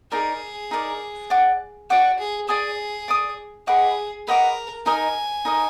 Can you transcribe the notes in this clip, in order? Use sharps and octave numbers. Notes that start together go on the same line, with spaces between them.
D#4 G#4 A#4 D5
D#4 A#4 D5
D5 F#5 D6
F#4 D5 F#5 D6
G#4
G#4 D5 G#5 D#6
D5 G#5 D#6
G#4 B4 D#5 F#5 D6
A#4 B4 D#5 F#5 D6
D#4 A#4 D#5 G#5
D#4 A#4 D#5